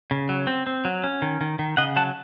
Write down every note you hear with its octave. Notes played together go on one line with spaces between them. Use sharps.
C#3
F#3
C4
C4
F#3
C#4
D#3
D#3
D#3
C#3 D#5 F#5
F#3 F#5 A5